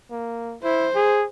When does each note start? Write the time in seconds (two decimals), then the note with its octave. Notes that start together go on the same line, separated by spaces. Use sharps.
0.11 A#3
0.63 E4 C5
0.95 G#4